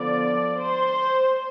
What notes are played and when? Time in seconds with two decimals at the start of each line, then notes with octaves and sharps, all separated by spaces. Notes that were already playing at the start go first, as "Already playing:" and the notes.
Already playing: D3 F3 B3 D5
0.60 C5